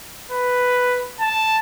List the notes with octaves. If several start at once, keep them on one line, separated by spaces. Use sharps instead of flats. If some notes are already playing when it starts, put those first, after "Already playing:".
B4
A5